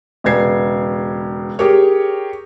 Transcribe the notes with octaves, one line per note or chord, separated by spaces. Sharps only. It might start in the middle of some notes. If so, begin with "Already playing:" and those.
E1 C#3 B3 G#6 C7
G4 G#4 A#4 C#5